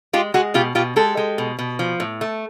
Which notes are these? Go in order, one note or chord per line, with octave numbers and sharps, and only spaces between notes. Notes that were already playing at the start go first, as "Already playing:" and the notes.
G#3 F4 G4
G#3 F#4 G#4
B2 F4 G4
B2 F4 G4
G#3 G4 A4
G#3
B2
B2
F3
A2
A3